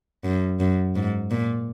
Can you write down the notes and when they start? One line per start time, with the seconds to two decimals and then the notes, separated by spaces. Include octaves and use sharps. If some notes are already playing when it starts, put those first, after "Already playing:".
0.24 F#2
0.60 F#2
0.96 G#2
1.31 A#2